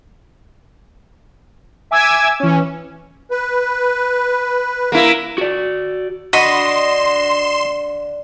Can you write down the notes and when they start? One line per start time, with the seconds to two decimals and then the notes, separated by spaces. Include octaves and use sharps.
1.91 E5 G#5 D6 E6 G#6
2.40 E3 C#4
3.31 B4
4.92 A#3 E4
5.38 F#4 D5
6.33 D3 F#4 D#5 B5 C6 E7